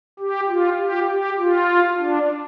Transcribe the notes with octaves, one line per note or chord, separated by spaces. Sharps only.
G4
F4
G4
G4
F4
D4